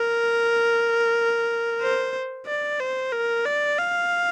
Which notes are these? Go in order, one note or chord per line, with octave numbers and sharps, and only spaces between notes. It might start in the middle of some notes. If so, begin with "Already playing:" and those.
Already playing: A#4
C5
D5
C5
A#4
D5
F5